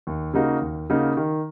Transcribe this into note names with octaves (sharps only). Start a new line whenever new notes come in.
D#2
C#3 A#3 D#4 F#4
D#2
C#3 A#3 D#4 F#4
D#3